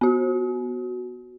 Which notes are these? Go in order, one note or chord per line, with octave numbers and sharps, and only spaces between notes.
B3 F#4